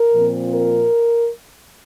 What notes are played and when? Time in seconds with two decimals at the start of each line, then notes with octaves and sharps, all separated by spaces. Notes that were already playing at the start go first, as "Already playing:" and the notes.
Already playing: A#4
0.14 A#2 F3 C4
0.51 A#4